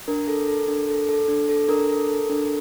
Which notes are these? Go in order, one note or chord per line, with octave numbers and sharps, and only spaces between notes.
D4 A#4
A4
A4
D4
A4
A4
D4
A4
D4 A#4
A4
A4
D4